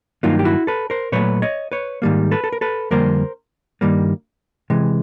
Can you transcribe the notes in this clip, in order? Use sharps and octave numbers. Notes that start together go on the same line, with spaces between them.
G2 D#3 F#3 A#3 D#4 F4
G4
E4 F#4
A4 B4
A#4 C5
A#2 F#3 A3 B4 C#5
C#5 D#5
B4 C#5
G#2 D#3 G3 A#3
A4 B4
A4
A#4
A4 B4
F2 D3 G3 A#3 A#4 C5
G2 D#3 G3 A#3
C3 E3 G#3